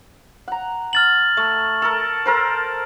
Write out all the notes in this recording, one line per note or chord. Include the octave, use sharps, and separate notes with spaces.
F#5 A#5
F6 A6 F#7
A3
A4 A#4
A4 A#4 C5